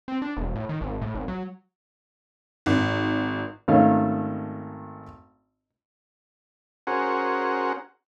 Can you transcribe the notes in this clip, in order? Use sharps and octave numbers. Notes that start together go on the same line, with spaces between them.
C4
D4
E1
A2
D#3
G#1
A2
G#1
F#3
G#1
G#1 D#3 A3 C#4 C#5 F5
C#4 F#4 G#4 A#4 C5 F#5